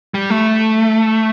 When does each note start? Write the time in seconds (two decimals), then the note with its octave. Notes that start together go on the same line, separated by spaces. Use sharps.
0.14 G3
0.30 A3